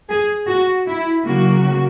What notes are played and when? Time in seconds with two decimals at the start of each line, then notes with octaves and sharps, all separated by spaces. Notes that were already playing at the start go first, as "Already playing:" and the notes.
0.09 G#4
0.48 F#4
0.87 E4
1.25 C#3 F#3 A#3 F#4